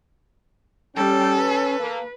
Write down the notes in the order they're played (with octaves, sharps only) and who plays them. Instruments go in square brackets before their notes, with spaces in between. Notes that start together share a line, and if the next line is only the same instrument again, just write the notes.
[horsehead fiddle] G3 G5 [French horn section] C#4 [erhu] A4
[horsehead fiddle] B4
[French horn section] A#3